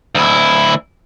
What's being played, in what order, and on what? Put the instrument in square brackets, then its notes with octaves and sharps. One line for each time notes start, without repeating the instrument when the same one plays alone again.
[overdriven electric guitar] D2 E4